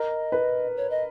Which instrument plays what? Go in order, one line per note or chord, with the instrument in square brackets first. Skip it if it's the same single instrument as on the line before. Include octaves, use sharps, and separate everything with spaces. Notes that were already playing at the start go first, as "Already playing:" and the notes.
Already playing: [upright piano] A#4 [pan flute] D#5
[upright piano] B4
[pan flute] C#5
D#5